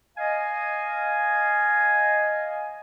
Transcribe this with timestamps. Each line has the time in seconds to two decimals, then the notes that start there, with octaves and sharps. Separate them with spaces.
0.18 D#5 F5 G#5